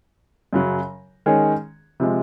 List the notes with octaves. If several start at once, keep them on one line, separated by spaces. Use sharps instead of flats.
F#2 C#3 F#3
D#3 G#3 C#4 G#4 C#5
C3 F3 G#3